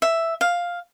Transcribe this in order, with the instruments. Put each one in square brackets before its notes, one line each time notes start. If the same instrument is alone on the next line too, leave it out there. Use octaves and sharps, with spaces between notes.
[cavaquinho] E5
F5